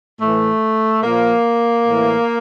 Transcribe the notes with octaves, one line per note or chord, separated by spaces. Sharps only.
A2 E3 A3
A#2 F3 A#3
A2 E3